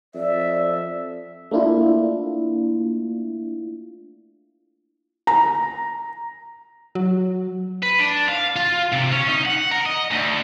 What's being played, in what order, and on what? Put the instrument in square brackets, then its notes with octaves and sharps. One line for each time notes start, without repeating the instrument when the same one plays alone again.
[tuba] F2 [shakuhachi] D5 [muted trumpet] E5
[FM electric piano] A3 A#3 D4 E4 F4
[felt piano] A#5
[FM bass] F#3
[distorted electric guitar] B4
D4
F5
F4
C3
C#4
D#4
F#5
A#4
D#5
D2